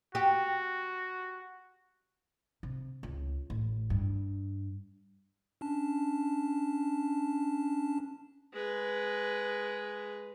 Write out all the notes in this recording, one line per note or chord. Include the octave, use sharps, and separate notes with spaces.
F#4 G4
C3
C#2
A1
G2
C#4 D4 A5
G#3 B4